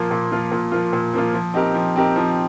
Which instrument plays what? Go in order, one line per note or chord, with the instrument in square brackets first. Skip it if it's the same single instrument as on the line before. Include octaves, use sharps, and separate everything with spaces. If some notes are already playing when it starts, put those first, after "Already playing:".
Already playing: [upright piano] A#2 F3 A#3 F4
A#2
F3 A#3 F4
A#2
F3 A#3 F4
A#2
F3 A#3 F4
F3
C4 D#4 G4 A#4
F3
C4 D#4 G4 A#4
F3